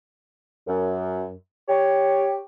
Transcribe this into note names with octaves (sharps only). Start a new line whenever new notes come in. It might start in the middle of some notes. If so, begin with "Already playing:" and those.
F#2
G4 C#5